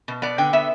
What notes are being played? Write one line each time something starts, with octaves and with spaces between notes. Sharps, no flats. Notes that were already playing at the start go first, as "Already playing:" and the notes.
B2
B3 D5
D3 G5
B3 E5